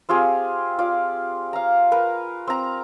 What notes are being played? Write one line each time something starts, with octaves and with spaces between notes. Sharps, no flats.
C4 F4 G4 G#4
F4 D5
F5 A#5
A#4 B4 A#5
C4 A#5